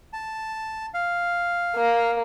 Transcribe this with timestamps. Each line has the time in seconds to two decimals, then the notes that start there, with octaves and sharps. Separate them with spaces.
0.13 A5
0.94 F5
1.76 A#3